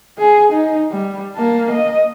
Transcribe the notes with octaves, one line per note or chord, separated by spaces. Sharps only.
G#4
D#4
G3
A#3 A5
D#5